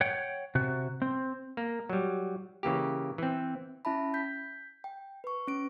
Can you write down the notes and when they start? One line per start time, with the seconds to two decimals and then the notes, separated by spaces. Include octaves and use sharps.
0.01 C#5 F#5 G5
0.55 C3 F#4
1.02 C4
1.57 A#3
1.90 F#3 G3
2.63 C#3 E3 A#3 G4
3.18 E3 C4
3.85 C#4 E4 E5 A5 B5
4.14 G6 B6
4.84 G5
5.24 B4 C#6
5.47 C#4 D7